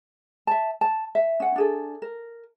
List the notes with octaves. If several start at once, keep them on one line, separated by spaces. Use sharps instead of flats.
E5 A5
A5
E5
C#4 F#5
D4 G#4 A4
A#4